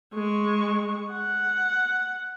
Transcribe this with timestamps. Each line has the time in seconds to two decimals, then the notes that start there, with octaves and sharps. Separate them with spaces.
0.14 G#3 C#6
1.12 F#5